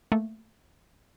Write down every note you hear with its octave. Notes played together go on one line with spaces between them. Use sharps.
A3 A#3